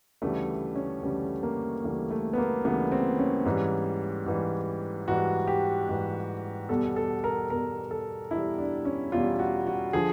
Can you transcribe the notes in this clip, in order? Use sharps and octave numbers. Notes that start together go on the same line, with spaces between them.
D2 C#3 E3 G3 A3
C#4
D2 C#3 E3 G3
A#3
D2 C#3 E3 G3 A3
A3
B3
A#3
D2 C#3 E3 G3 B3
C4
C#4
G#2 E3 G3
G#2 E3 G3
G#2 E3 G3 F#4
G4
G#2 E3 G3
E2 B2 G3 A4
A4
A#4
E2 B2 G3 A#4
A4
E2 B2 G3 E4
D4
C#4
E2 B2 G3 F4
F#4
F#4
D3 F3 G#4